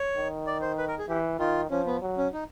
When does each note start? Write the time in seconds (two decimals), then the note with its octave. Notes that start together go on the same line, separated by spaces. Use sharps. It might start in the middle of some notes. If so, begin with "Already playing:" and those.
Already playing: C#5
0.16 D#3
0.47 D5
0.61 C5
0.78 B4
0.88 A#4
0.99 G#4
1.09 E3 G4
1.39 D#3 F4
1.70 F3 C#4
1.86 B3
2.02 F#3
2.17 C#4
2.33 D#4